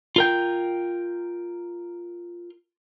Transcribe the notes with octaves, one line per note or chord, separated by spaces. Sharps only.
F4 A#4 G5